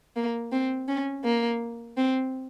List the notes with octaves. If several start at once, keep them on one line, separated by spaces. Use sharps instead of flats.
A#3
C4
C#4
A#3
C4